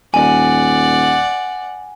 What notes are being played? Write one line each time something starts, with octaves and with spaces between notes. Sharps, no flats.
D#1 D5 F#5 G#5